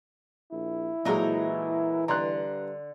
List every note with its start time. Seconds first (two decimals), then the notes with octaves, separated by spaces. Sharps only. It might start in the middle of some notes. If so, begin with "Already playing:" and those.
0.52 A#1 E4
1.05 A#2 E3 F#3 G#3 D#4 A4 A#4
2.08 G2 D3 A#5 C6 F#6